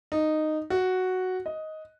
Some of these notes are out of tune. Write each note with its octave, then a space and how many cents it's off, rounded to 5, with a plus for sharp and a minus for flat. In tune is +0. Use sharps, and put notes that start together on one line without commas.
D#4 -10
F#4 +0
D#5 +10